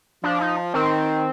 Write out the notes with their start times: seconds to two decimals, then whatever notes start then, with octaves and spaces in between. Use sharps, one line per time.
0.24 F3 D4
0.41 D#4
0.73 D#3 C4